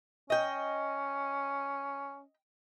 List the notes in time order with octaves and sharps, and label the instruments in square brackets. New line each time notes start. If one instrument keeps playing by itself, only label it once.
[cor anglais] C#4 [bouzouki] D#5 G5